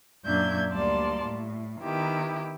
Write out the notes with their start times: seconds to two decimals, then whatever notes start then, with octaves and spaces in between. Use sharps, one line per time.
0.25 F#2 A#2 D4 E5 G6 G#6
0.72 D2 G3 A#3 D5 A5 C6
1.24 A2
1.82 D#3 B3 E4 G4